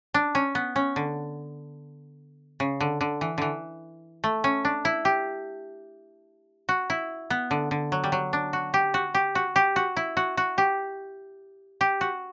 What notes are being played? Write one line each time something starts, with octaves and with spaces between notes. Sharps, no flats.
D4
C#4
B3
C#4
D3
C#3
D3
D3
E3
D3 E3
A3
C#4
D4
E4
G4
F#4
E4
B3
D3
D3
F#3
G3
F#3
D4
F#4
G4
F#4
G4
F#4
G4
F#4
E4
F#4
F#4
G4
G4
F#4